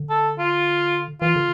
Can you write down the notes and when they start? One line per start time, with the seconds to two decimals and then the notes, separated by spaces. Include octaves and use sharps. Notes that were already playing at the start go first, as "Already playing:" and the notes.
Already playing: D3
0.10 A4
0.39 F4
1.21 E3 F4
1.36 D3